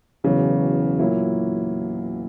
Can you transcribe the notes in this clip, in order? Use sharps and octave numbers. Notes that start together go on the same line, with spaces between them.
E1 E2 C#3 F#3
A#2 F#3 A#3 E4